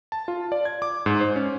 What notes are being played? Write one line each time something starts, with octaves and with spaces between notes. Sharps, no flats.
A5
F4
D5
G#6
D6
G#2
C5
C#4